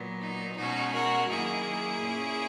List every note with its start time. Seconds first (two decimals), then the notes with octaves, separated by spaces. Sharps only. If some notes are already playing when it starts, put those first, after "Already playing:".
Already playing: A#2 F#3 B3
0.20 D#4
0.56 B2 G#3 C#4 D#4 F#4
0.93 F#4 A#4
1.29 F#2 D#3 A#3 E4 G#4
2.00 A#2 A#3 C#4